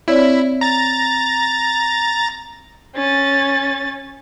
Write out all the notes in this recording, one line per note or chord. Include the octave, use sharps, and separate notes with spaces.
C4 E4 C#5 D5
A#5 A6
C#4 A6